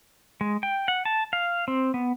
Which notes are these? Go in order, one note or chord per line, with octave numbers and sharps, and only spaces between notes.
G#3
G5
F#5
A5
F5
C4
B3